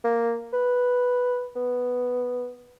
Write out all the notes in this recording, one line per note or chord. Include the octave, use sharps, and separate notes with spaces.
A#3
B4
B3